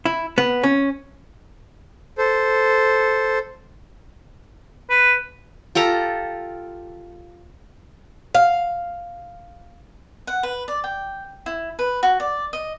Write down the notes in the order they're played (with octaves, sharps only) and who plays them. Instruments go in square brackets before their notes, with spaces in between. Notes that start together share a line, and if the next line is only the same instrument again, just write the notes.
[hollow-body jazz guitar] E4
B3
C#4
[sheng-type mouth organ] A4 C5
[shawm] B4
[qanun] F4 G4 A4 A#5
[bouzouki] F5
[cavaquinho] F#5
B4
D5
G5
E4
B4
F#4
D5
D#5